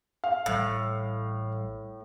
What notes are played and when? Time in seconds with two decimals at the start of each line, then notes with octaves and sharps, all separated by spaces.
0.24 F5
0.46 A1 A2 G3